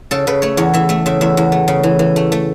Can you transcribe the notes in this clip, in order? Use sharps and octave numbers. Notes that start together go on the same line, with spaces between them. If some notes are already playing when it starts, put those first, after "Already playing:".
C#3 A4
C#3 B4
A3 C#5
E2 C#5
E3 E5
A3 E5
C#3 E5
E2 E5
E2
A3
C#3
E3
E3
A3
A3